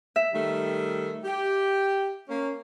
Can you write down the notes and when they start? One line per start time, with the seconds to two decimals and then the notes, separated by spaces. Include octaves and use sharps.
0.16 E5
0.34 D#3 G3 A3
1.24 G4
2.29 A#3 C#4